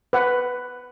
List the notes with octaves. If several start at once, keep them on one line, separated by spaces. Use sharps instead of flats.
B4 F#5